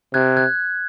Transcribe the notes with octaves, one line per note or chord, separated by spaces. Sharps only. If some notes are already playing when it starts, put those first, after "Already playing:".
C3 F#6 G#6
F#6 G#6